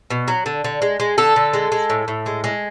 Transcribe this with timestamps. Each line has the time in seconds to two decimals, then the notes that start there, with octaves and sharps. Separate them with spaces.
0.10 B2
0.28 F#3
0.46 D3
0.64 D3
0.82 G#3
1.00 G#3
1.18 D3 A4
1.36 D3
1.53 G#3
1.72 G#3
1.90 A2
2.08 A2
2.26 G#3
2.44 G#3